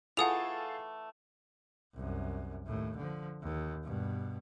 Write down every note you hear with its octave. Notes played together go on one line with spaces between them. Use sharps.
E3 A3 F4 G#4 A4 F#5 D#6 F7
C2 F#2
D#2 A2
D3 F3
D#2
G2 B2